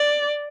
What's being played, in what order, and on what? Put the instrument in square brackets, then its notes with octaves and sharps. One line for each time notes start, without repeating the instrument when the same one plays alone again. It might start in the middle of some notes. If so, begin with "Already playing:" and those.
Already playing: [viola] D5